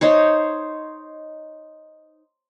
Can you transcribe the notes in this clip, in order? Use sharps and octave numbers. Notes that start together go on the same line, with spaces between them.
D#4 C5 C#5